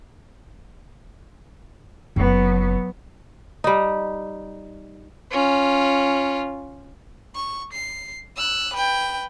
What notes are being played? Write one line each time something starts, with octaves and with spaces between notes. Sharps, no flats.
F#1 F#3 B3
G3 D#4
C#4 F4
C#6
C7
E6 F#6
B4 G5